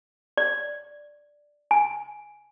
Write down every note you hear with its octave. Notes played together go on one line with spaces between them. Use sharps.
D5
G#5